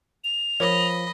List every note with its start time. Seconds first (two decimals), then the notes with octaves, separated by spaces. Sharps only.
0.24 F7
0.60 F3 A#4 C#5 D#5 B5